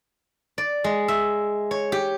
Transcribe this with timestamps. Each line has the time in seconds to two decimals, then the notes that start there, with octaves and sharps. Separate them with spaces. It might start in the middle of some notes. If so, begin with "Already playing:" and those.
0.58 D5
0.84 G#3
1.08 E5
1.71 C#5
1.92 G4